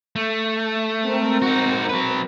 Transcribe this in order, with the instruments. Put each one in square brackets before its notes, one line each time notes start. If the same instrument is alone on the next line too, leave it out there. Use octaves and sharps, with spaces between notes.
[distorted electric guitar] A3
[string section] G#3 C4 A#4
[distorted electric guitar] D#4 F#4
F#3 B4